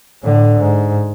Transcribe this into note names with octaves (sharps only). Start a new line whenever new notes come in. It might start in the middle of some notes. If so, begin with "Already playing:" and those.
A2 D3
G#2